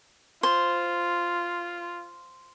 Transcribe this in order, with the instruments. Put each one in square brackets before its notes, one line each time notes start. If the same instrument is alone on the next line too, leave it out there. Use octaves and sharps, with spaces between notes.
[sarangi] F4 [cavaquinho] C5